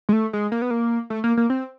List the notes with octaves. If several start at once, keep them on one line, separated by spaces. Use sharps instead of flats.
G#3
A3
G#3
A#3
B3
A#3
A3
A#3
A#3
C4